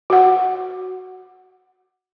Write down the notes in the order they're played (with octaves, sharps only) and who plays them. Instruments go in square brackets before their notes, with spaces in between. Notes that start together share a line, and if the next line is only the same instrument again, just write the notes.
[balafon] F#4 F#5